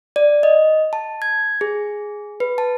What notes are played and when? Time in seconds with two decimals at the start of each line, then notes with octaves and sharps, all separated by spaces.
0.16 D5
0.43 D#5
0.93 A5
1.22 G#6
1.61 G#4
2.40 B4
2.58 A5